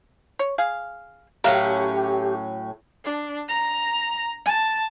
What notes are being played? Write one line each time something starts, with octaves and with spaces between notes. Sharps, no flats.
C#5
G#4 F5
A2 F#3 C#4 G4 A#4 F5
D4
A#5
A5